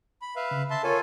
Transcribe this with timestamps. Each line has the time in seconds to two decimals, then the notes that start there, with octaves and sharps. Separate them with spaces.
0.22 B5
0.36 B4 E5 F5
0.51 C#3
0.70 E5 A5 C6
0.83 F4 A4 A#4 C#5 G#5 C#6